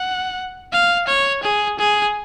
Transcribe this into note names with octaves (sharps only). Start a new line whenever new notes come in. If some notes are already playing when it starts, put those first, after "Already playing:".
Already playing: F#5
F5
C#5
G#4
G#4